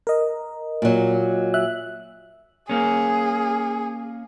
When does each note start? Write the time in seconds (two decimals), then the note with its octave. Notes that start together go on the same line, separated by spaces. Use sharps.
0.07 A#4 D#5
0.82 A#2 F#3
1.54 E5 F#6
2.69 A#3 C#4 G#4